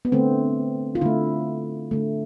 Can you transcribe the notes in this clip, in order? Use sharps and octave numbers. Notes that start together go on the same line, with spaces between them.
B3
D3 A3 C4
F4
D3 A3 E4
D3 A3